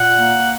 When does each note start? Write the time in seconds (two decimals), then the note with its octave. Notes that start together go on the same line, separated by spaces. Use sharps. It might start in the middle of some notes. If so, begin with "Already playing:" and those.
Already playing: A#2 F#5
0.16 A#3